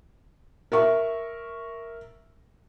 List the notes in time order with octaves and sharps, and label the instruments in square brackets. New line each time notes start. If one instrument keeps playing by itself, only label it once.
[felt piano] A#4 E5 C#6